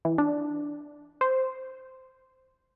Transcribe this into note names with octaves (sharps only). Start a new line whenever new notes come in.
E3
D4
C5